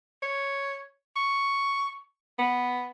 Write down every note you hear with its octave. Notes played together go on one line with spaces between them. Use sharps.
C#5
C#6
B3